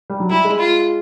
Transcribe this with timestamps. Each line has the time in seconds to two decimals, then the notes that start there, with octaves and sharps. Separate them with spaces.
0.10 G3
0.20 F#3
0.30 G3 E4
0.45 G#3
0.59 F4